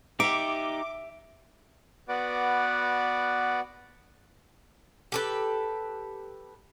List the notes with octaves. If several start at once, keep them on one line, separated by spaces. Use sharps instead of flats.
D#4 G4 E5 D6 D7
B3 F#4 B4 D5 F#5 D6
G4 A4 B4